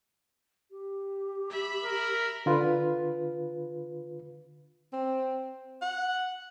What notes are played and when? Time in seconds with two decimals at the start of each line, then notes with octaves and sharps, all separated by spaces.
0.71 G4
1.50 E5 B5
1.84 A#4
2.46 D3 F4 B4
4.93 C4
5.82 F#5